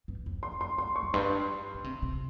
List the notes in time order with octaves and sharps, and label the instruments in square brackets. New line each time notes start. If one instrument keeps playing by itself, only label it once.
[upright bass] G2
F2
[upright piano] C6
C6
[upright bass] G2 [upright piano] C6
[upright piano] C#6
[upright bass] F2
[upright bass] G2 [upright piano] C6
[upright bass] C#3
C3
C3